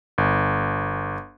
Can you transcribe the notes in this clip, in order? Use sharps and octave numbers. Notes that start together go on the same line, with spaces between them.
G1